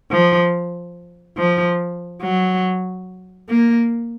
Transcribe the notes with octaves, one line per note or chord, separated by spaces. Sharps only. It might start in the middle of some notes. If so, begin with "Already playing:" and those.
F3
F3
F#3
A#3